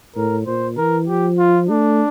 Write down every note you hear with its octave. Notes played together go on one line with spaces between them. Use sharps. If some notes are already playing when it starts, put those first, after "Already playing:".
A2 A#4
A#2 C5
E3 A#4
F3 G4
F4
A3 D4